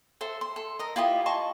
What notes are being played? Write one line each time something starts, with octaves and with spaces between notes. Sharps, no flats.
A4 C5 E5
C6
A4
A#4 D#5
E4 F4 G4 D#5
D#5 A5 C6 C#6